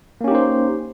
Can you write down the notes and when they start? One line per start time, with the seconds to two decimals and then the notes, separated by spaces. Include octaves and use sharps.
0.21 A#3
0.24 C#4
0.28 G4
0.31 D#4
0.35 C5